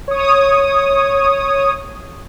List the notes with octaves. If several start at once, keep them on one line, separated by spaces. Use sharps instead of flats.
C#5 D#6